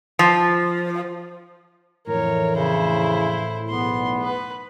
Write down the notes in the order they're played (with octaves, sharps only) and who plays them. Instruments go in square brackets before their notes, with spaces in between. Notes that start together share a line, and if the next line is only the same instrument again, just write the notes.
[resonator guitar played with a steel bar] F3
[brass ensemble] F2 D3 E3 [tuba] A2 [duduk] A#4 [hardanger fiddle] C#5
[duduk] C#3 [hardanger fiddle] E4 C5
[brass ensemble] B1 E2 [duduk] B3 [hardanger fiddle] C6
[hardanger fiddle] B4